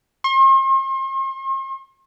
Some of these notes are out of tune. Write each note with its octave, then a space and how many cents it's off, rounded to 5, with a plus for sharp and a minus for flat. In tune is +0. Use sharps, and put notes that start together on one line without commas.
C6 +40